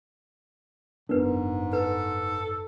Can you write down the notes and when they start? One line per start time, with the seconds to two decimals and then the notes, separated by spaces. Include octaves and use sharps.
1.09 F#1 G#2 B3 D4 A#4 B4
1.73 A4 B4